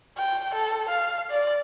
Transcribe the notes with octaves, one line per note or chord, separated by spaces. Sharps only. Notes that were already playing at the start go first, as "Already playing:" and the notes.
G5
A4
F5
D5